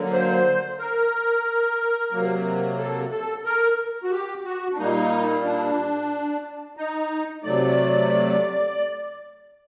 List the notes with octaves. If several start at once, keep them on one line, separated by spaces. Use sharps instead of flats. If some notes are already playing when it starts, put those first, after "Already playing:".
Already playing: D3 F#3 A#3
C5
A#4
C3 F#3 A#3
A4
A4
A#4
F#4
G4
F#4
D4
A#2 G3 A#3 D#4
D4
D#4
C3 F#3 A3 D5